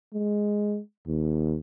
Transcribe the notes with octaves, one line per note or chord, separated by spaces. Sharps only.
G#3
D#2